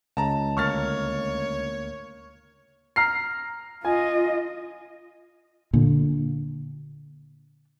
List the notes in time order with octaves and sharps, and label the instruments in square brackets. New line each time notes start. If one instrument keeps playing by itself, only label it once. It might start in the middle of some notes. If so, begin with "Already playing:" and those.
[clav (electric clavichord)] C#2 [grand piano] A5 A#5
[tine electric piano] D2 A#3 A#4 [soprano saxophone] C#5 [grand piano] C#6 F6 A6
[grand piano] A#5 F6 C7
[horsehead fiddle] F4 D#5 [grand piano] G#5
[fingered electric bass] A#2 D3